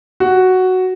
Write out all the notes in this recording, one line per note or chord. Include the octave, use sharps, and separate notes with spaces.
F#4